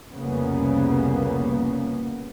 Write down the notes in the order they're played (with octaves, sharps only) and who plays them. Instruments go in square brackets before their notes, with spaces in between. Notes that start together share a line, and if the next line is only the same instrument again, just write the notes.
[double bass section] F1 C2 A#2 C#3 A#3 B3